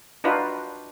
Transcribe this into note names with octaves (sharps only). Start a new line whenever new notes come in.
D4 D#4 F4 F#4 B4